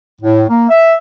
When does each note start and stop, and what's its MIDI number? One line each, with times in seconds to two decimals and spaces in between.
0.21 0.43 45
0.48 0.64 58
0.69 0.95 76